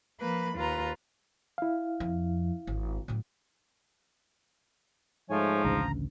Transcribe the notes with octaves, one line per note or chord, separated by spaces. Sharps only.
F3 A#3 B4 B5
D#2 F4 B4 A#5
E4 F5
F2
G#1
A2 F#3
G#2 F3 A3 C#5 G#5
A1 D2 C#3 A#5